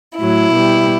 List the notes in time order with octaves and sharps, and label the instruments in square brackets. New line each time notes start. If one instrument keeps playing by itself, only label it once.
[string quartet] A2 F#3 E4
B2 G3